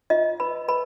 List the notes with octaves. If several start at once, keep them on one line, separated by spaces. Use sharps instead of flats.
F4 D#5
B4 B5
B4 B5